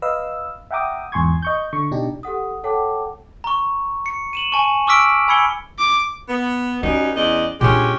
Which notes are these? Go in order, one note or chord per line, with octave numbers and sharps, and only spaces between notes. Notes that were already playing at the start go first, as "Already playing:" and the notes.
B4 D#5 F5 E6
E5 F#5 G5 A#5 D6 D#6
E2 G#2 G#5 C6 C#6 G#6
D#5 C#6 G6
D3 C#6
B2 D4 D#4 G4
G4 A4 F#5 D#6
A4 C#5 F#5 G5 A5 D6
A#5 C#6
C#7
D#7 E7 F#7
G#5 A5 C#6
C#6 D6 E6 F6 B6 D7
G#5 B5 E6 G#6 C#7 G7
D6
B3
F#2 G3 C#4 D#4
E2 D5 D#5
A#2 G#3 C#4 D4 G4